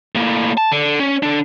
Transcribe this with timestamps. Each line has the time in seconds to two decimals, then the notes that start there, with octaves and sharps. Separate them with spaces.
0.15 A2 A#3
0.57 A5
0.72 D3
1.00 C#4
1.23 D3 D4